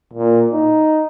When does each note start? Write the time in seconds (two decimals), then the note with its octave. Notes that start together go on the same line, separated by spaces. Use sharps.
0.14 A#2
0.53 D#4